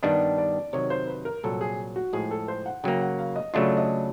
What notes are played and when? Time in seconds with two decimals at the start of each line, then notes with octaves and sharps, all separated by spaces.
0.03 G2 D#3 G3 B3 D4 D#5
0.38 D5
0.73 C3 D#3 F#3 C#5
0.90 C5
1.07 B4
1.25 A#4
1.43 C2 A#2 F#3 A4
1.61 G#4
1.96 F#4
2.13 A2 F3 G#3 G#4
2.31 A4
2.48 C5
2.66 F#5
2.84 C#3 F#3 A#3 G5
3.01 F#5
3.19 F5
3.36 D#5
3.54 C#3 F#3 A3 D4 F4 D#5
3.77 D#5